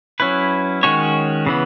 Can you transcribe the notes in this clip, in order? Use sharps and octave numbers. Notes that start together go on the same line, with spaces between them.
F#3 C#4 E4 B4
D#3 G#3 C#4 F#4 C#5
C#3 E3 B3